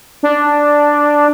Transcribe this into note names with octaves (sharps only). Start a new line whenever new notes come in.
D4